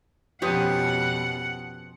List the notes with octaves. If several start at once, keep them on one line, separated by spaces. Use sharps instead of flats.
F2 B2 F3 B3 C#4 G4 F#5 G#5